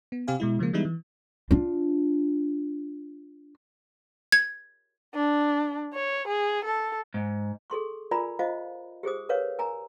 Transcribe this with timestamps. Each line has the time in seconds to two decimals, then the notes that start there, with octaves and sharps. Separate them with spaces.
0.12 B3
0.28 C3 C4 G4 F5 G#5
0.40 B2 G#3 E4
0.59 C#3 F3 G#3 A#3
0.73 E3 G3 G#3 B3 D#4 E4
0.85 E3
1.51 D4 F4
4.32 G#6
5.14 D4
5.94 C#5
6.28 G#4
6.65 A4
7.14 G#2
7.70 G#4 A4 C6 C#6
8.11 F4 A#4 D5 G#5 A#5 B5
8.39 F4 C5 D#5 F5
9.03 G4 G#4 C5 D#6
9.29 A#4 B4 C#5 F5
9.59 A#4 G#5 A#5